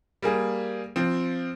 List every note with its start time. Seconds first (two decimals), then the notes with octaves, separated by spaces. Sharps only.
0.22 G3 A#3 G#4
0.96 F3 C4